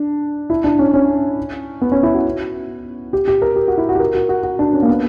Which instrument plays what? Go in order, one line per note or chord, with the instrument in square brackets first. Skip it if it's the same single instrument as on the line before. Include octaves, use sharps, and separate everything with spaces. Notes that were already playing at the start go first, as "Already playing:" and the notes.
Already playing: [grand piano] D4
E4
D4
C#4
C#4
B3
C#4
E4
F#4
G4
G4
A#4
G4
F#4
E4
F#4
G4
A#4
F#4
F#4
F#4
D4
C#4
A#3
B3